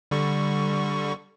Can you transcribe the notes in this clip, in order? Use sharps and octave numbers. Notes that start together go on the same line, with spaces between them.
D3 G3 C#6